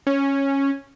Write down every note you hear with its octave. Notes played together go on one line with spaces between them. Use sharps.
C#4